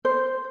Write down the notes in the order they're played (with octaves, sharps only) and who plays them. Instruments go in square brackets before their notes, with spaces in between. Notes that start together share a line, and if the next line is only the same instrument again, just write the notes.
[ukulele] C5